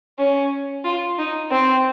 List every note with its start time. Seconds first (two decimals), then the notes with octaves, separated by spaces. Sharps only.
0.19 C#4
0.84 F4
1.18 D#4
1.51 C4